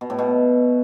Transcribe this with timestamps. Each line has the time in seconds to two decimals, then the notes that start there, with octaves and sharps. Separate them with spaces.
0.01 B2
0.10 A2
0.19 B2